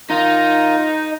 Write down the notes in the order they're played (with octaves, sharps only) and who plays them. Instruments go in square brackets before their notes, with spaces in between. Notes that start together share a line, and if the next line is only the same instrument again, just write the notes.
[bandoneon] D#3 F4 A#5 [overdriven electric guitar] D#4